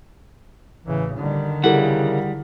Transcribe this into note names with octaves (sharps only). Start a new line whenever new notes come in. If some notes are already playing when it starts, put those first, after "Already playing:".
A1 C#3 E3
D3 D#3 G3
C#3 G3 E4 G4 A#4 F#5